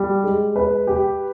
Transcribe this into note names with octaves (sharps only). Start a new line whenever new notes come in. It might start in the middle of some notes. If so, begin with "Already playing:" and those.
Already playing: G3
G#3
B4
G4